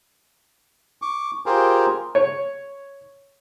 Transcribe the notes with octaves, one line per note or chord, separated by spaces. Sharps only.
C#6 D6
F4 G4 G#4 A#4 C5
C#5